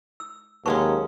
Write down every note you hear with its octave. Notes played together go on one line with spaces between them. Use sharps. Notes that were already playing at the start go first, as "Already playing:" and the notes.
E6
D#2 F#3 G#3 C#4 B4 A5 C#6